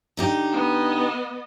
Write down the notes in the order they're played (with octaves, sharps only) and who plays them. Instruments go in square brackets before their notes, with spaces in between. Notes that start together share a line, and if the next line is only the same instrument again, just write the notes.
[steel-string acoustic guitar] D3 D#4 G4
[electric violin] B3 D#5